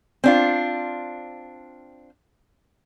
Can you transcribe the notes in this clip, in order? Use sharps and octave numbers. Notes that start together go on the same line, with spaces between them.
C4 D4 F4